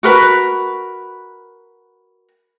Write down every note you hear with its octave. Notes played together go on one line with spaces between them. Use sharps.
F#4 A#4 B4